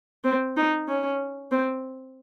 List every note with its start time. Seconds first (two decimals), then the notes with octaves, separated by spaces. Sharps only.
0.24 C4
0.57 D#4
0.88 C#4
1.51 C4